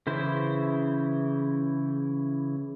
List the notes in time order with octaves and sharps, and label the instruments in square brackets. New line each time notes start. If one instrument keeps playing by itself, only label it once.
[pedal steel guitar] C#3 E3 E4 C5